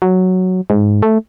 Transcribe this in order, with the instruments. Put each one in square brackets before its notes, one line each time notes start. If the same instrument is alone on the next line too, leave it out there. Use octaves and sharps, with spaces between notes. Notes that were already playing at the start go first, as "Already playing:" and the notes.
[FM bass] F#3
G#2
A3